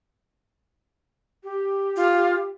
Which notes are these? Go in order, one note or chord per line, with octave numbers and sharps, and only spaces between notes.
G4
F4